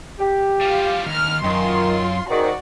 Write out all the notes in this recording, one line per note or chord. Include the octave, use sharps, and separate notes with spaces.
G4
G3 F4 F5
D#2 F6
F#2 D#3 F4 C6
G#2 D#3 F#4 D5